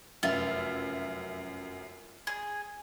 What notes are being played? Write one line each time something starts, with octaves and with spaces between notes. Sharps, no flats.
F1 F#2 F4 E5
G#4